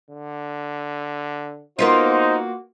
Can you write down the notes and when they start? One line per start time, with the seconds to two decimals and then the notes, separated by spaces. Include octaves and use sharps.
0.11 D3
1.79 A#3 B3 D#4 F4 F#4 C5